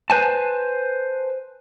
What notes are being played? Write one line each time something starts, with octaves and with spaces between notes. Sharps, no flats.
B4 C5 G#5 A5